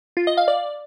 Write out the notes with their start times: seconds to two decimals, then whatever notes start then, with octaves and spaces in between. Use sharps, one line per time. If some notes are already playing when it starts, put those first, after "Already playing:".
0.17 F4
0.27 D#5
0.37 F5
0.48 D5